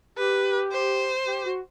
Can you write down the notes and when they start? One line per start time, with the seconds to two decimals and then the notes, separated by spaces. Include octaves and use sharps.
0.17 G4 B4
0.72 C5
1.27 G4
1.45 F#4